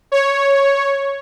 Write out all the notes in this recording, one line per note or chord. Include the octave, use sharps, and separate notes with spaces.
C#5